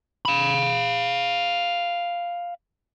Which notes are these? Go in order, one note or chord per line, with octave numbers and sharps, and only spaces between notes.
F5 B5